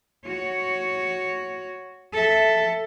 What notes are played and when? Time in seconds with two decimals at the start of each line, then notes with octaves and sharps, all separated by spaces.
0.26 F#4 C#5
2.13 A4 E5